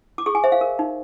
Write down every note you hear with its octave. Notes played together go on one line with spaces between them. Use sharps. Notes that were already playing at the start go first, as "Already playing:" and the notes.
D6
G#4 C#6
G#5
C5 E5
F5
A#4
D#4